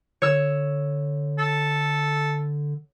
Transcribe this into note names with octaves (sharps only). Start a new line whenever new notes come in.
D3 C#5 E6
A4